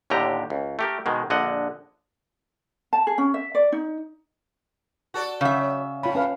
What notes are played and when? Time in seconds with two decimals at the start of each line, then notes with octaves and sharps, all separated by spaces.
0.10 D#2 A2 D3 G4 A#5
0.50 C#2
0.79 A3 G4 A#4
1.06 B2 D#3 G#3
1.30 A#1 D3 D#5 F#5
2.93 A5
3.07 G#4
3.18 C#4
3.34 E5
3.55 D5
3.72 D#4
5.14 F#4 A4 D5
5.41 C#3 F#3 E5
6.03 A2 F4 B5
6.15 C#4 B4 F5